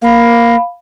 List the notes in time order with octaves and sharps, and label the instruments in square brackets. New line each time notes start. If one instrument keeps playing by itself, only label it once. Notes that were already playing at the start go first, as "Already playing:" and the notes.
[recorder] A#3 [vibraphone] F5 B5